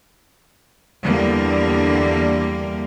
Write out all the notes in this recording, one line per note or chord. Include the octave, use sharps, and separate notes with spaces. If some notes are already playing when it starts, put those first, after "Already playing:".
E2 D3 G3 A#3